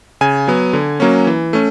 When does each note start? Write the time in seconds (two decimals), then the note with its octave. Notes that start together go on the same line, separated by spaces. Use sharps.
0.21 C#3 G#5
0.48 F#3 B3
0.73 D3
1.00 F#3 A#3 C#4
1.27 E3
1.53 A3 C#4